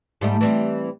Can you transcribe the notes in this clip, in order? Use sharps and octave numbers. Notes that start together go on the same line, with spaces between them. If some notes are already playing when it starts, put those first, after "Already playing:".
G#2 G3 A3
E3 G3 C4